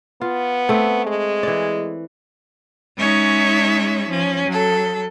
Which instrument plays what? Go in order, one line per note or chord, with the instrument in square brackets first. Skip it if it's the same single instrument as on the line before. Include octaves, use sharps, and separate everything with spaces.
[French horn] B3 [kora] F4
[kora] A3 C4
[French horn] G#3
[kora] E3 D5
[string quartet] G#3 C#4 D#4 C#5 E5 C#6
F3 C#4
F#3 A4